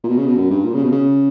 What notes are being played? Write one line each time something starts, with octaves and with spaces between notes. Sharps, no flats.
A#2
B2
C#3
B2
F#2
G2
A#2
C#3
B2
C#3